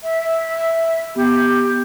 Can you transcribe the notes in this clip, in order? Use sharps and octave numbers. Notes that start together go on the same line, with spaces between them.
E5
B3 G4